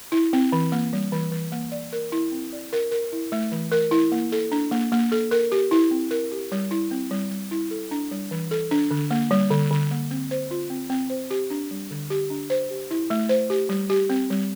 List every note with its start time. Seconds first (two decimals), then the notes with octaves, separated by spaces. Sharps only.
0.12 E4
0.33 C4
0.52 E3
0.72 A#3
0.93 G3
1.12 E3
1.32 E3
1.52 A#3
1.72 D5
1.93 A#4
2.12 E4
2.32 C4
2.53 D5
2.73 A#4
2.92 A#4
3.12 E4
3.32 A3
3.52 E3
3.72 A#4
3.91 E4
4.12 A#3
4.32 A4
4.52 D4
4.71 A#3
4.92 A#3
5.12 A4
5.31 A#4
5.52 G4
5.71 E4
5.91 C4
6.11 A#4
6.32 G4
6.52 G3
6.71 E4
6.91 C4
7.11 G3
7.31 G3
7.51 E4
7.71 A4
7.91 D4
8.11 G3
8.31 E3
8.51 A4
8.71 D4
8.91 D3
9.11 A#3
9.31 G3
9.51 D3
9.71 D3
9.91 A#3
10.11 C4
10.31 C5
10.51 F4
10.70 C4
10.90 C4
11.10 C5
11.31 G4
11.50 D4
11.71 G3
11.91 D3
12.10 G4
12.30 D4
12.50 C5
12.71 G4
12.91 E4
13.10 A3
13.29 C5
13.50 G4
13.69 G3
13.90 G4
14.10 C4
14.30 G3